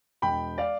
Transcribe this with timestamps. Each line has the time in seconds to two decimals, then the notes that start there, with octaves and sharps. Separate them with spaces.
0.22 E1 G5 B5
0.58 D5 F5